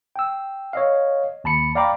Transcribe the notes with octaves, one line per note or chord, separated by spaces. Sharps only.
G5 E6
C#5 D#5 F5
D#2 A5 B5 C#7
D5 F5 G5 A#5 B5 D6